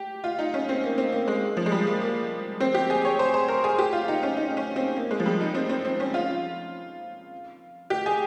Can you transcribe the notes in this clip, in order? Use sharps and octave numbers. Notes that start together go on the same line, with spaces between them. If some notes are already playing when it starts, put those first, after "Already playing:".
Already playing: G4
F4
D#4
C#4
C4
A#3
C4
A#3
G#3
F3
G#3
G3
A#3
A#3
C4
G4
G#4
C#5
C5
C5
A#4
G#4
G4
F4
D#4
C#4
D#4
C#4
C4
A#3
G#3
F3
G3
D#4
C4
C4
C4
C#4
F4
G4
G#4